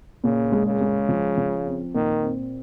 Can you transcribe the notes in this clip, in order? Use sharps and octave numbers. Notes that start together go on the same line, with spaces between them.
A#2 C#3
G#3
C#3
G#3
F3
F3
C4
A#2 D#3
C4